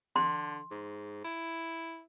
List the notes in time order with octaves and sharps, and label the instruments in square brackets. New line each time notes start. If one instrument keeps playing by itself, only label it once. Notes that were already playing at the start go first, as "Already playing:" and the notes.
[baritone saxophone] D3 [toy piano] C6
[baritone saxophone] G#2
E4